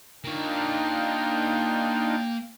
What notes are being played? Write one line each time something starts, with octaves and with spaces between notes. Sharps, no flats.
A#3 D4 D#4 F4 C#5 G5